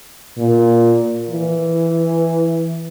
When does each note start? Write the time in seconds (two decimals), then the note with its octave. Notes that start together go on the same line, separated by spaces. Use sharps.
0.38 A#2
1.30 E3